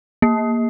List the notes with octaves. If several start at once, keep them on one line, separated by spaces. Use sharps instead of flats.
A#3